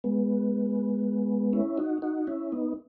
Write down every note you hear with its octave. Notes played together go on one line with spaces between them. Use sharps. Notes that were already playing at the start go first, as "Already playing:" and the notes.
G#3 B3
C#4 E4
D#4 F#4
D#4 F#4
C#4 E4
B3 D#4